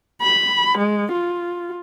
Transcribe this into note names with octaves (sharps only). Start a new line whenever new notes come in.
B5
G#3
F4